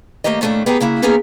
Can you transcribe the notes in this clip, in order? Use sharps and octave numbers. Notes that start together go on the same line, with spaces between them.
D#2 G#2 A3 A#3 G4 D#5
A2 D#3 A3 A#3 D4
B3 G4 G#4 G5 A5 A#5
C#3 A#3 E4 F#4
A#3 B3 C#4 D#4 G#4 A#4